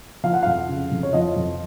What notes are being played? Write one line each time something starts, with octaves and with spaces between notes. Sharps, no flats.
F3 F5
F#5
F2 F5
C#3
F2
C#5
F3 D#5
F2